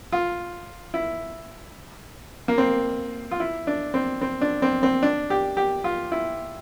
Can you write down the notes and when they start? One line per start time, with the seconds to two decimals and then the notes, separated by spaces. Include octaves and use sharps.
0.12 F4
0.94 E4
2.48 A#3
2.58 C4
3.31 F4
3.40 E4
3.67 D4
3.94 C4
4.21 C4
4.41 D4
4.62 C4
4.83 C4
5.03 D4
5.30 G4
5.57 G4
5.84 F4
6.12 E4